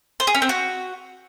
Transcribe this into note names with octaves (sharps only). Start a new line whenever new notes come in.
C5
G#4
C#4
C4
F#4